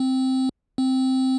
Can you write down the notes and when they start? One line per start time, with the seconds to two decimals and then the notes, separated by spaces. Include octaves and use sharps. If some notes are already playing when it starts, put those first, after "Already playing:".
Already playing: C4
0.78 C4